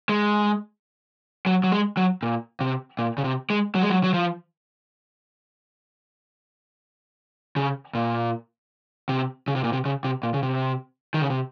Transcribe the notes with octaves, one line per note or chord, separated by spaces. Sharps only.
G#3
F#3
F#3
G#3
F#3
A#2
C3
A#2
C#3
C3
G#3
F#3
G#3
F#3
F#3
F3
C#3
A#2
C3
C#3
C3
A#2
C3
C#3
C3
A#2
C#3
C3
D#3
C#3
C3